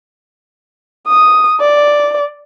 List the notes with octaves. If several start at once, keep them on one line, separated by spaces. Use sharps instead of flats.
D#6
D5